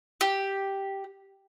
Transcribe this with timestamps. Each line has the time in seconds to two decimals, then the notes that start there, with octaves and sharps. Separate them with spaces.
0.21 G4